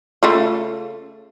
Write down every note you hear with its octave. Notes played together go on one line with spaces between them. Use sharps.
C#3 A3 F4